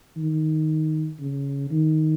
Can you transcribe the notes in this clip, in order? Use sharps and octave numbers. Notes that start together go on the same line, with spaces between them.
D#3
C#3
D#3